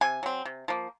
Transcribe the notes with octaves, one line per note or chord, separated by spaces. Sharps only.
C3 G#5
F#3 C4
C3
F3 A#3